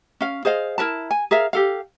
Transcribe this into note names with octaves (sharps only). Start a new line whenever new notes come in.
C#4 F5
G#4 C5 D#5 F5
E4 A#4 B4 A5
G#5
G#4 A#4 E5 F5
G4 A4 F5